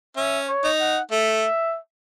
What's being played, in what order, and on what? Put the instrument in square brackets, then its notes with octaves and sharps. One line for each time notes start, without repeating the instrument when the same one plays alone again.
[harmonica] C#4 [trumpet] E5
[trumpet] C#5
[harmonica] D#4
[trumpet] F#5
[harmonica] A3 [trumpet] E5